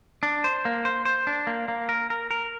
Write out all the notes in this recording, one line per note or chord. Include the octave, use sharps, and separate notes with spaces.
D4
C5
A#3
C5
C5
D4
A#3
A#3
A#4
A#4
A#4